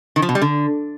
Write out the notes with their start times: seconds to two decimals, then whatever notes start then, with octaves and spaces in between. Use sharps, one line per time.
0.16 D#3
0.22 F3
0.29 B2
0.35 G3
0.41 D3